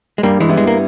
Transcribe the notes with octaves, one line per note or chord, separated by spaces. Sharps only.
G#3
G2 G3 A#3
E3 G#3
G3 B3 E4
G#3
A#3